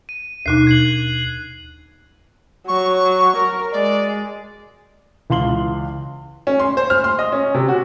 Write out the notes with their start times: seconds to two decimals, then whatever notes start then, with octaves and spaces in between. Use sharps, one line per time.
0.09 D#7
0.46 D#2 B2 D#4 F#6 C7
0.67 G#6 C7 F#7
2.68 F#3 C#6
3.37 A#4
3.72 G#3 D5
5.30 C#2 E3 F5 C6 F#7 G7
6.47 C#4
6.60 C6
6.77 C5
6.90 F6
7.04 C6
7.19 D#5
7.32 C#4
7.54 C3
7.68 F#4